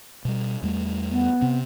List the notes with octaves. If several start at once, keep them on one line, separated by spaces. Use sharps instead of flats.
B2 G3
E2 G3 A3
B3
C3 C4